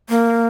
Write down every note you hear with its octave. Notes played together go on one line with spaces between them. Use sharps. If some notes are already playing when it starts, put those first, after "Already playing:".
A#3